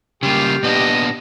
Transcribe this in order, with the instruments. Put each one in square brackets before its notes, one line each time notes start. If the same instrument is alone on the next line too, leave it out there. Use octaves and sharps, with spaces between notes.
[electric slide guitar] C#3 G3 A#3 [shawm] F4 [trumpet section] G4
[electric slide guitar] A#2 B3 D4 [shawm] D#5